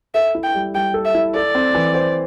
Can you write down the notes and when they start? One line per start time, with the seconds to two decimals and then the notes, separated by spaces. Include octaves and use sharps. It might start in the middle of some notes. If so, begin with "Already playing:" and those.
0.15 A4 E5
0.35 E4
0.44 G5
0.55 G3
0.74 G3 G5
0.94 A4
1.05 E5
1.15 E4
1.34 A4 D5
1.55 C4
1.75 E3
1.95 C5